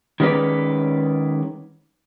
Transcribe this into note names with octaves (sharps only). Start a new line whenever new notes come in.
D#3 G#3 C#4 D#4 B4 D5